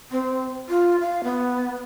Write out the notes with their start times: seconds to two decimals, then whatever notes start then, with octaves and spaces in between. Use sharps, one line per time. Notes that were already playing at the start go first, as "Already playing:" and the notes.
0.11 C4
0.69 F4
1.01 F5
1.24 B3